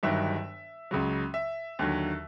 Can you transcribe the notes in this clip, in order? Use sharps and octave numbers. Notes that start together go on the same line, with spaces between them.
G1 G2 D#3 F#3 E5
C#2 C#3 F#3
E5
D#2 D3 F#3